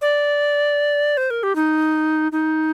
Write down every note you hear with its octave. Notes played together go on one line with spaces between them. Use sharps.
D5
C5
A#4
G4
D#4
D#4